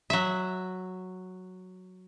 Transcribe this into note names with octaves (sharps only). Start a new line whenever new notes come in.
F#3 E5